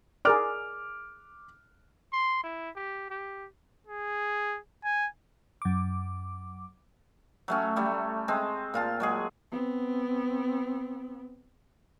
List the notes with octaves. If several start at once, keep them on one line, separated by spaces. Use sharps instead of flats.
G#4 A#4 D5 D6 F6
C6
E4
G4
G4
G#4
G#5
F#2 D6
F#3 A3 C#4
G3 A3
G#3 C4
A#2 F4 A5
F#3 G#3 G#4
B3 C4